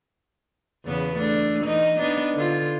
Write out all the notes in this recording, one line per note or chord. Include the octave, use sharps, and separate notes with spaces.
E2 C#3 B3
A3 D4
E3 D#4 D#5
B3 D4 D#4
D3 F4